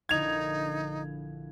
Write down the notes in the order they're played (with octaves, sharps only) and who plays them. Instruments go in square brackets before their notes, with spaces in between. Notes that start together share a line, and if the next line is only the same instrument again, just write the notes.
[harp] A#1 D3 E4 [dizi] D#4 [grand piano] G#6 F7